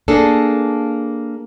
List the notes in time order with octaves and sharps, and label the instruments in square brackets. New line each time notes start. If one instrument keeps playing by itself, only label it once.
[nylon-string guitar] A#3 D4 G#4 A4